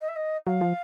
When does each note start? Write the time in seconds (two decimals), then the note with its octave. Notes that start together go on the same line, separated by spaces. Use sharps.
0.01 D#5
0.08 E5
0.16 D#5
0.46 F#3 F5
0.61 F3